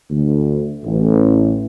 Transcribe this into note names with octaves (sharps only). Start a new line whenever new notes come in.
D2
A1